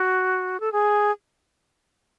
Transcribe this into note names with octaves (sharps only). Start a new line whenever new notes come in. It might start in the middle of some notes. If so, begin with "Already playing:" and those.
Already playing: F#4
A4
G#4